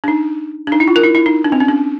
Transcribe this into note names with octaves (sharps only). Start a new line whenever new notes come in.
D4
D#4
D4
D#4
E4
F4
A#4
E4
E4
D#4
D4
C4
C#4
D4